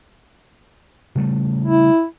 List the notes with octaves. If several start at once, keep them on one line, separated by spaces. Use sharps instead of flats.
C#3 G3 A3
E4